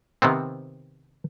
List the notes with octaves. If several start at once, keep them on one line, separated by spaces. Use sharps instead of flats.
C3 D#3 B3 C4